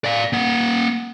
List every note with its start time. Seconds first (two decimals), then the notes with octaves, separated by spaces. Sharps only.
0.04 D5 F5
0.33 A#3 F#5